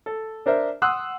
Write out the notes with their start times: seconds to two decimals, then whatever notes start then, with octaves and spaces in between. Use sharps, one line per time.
0.06 A4
0.46 D4 A#4 C5 E5
0.82 F#5 C6 D#6 E6 F#6